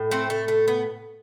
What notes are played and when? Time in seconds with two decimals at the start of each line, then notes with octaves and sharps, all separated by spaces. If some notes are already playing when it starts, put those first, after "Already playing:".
Already playing: A2
0.11 A3 C4
0.30 A3
0.48 A3
0.68 B3